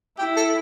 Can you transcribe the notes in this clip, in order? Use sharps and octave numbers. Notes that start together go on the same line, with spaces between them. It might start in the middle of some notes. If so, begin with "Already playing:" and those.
E4 G4
A4